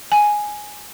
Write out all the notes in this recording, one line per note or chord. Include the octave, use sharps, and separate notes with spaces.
G#5